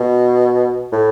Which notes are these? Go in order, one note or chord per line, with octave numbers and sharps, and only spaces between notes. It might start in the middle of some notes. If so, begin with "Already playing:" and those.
Already playing: B2
A2